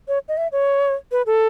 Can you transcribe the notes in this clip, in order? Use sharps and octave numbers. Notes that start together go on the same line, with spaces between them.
C#5
D#5
E5
C#5
B4
A4